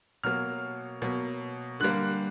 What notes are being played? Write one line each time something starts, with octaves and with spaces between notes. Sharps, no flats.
B2 F#3 A#3 F6
B2 F#3 A#3
D3 G3 A#3 F#6